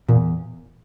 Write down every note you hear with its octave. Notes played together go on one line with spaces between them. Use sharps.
E2 A#2